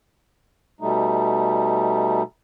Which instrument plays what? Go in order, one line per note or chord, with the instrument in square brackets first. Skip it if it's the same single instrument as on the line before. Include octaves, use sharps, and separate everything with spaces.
[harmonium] B2 G3 A3 D#4